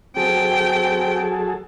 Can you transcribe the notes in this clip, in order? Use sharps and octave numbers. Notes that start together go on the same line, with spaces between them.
F#3 C4 G#4 A4 G5